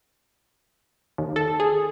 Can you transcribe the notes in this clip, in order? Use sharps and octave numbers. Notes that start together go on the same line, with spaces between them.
D#2
A4
G#4